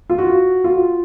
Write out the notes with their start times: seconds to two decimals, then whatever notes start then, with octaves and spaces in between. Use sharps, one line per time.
0.10 F4
0.18 F#4
0.64 F4